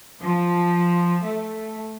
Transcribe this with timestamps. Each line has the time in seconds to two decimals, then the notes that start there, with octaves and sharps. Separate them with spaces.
0.22 F3
1.24 A3